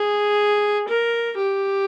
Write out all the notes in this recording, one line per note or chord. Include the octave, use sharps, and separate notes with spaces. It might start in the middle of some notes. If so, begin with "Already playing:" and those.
Already playing: G#4
A#4
G4